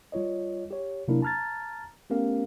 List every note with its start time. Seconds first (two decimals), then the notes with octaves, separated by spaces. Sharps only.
0.12 G3 F4 C#5 D#5
0.71 G4 C#5
1.08 C3 F#3 A#3 D4 E4 A#4
1.22 A5 A#5 F6 G#6 A6
2.10 A3 B3 C#4 G4 A#4 F5